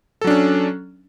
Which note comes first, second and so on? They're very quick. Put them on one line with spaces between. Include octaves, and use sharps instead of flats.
A4 F#3 D4 C#4